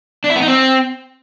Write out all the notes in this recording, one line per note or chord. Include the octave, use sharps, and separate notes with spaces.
D4
E4
B3
D#4
C4